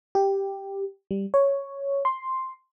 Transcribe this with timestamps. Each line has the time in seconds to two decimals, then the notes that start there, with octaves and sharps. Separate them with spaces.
0.15 G4
1.11 G3
1.34 C#5
2.05 C6